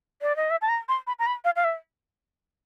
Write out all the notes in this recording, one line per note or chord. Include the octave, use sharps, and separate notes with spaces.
D5
D#5
E5
A5
A#5
C6
B5
A#5
B5
F5
F5
E5